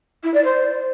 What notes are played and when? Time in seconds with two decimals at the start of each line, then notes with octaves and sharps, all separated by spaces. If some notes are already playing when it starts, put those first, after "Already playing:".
0.24 E4
0.34 D5
0.45 C5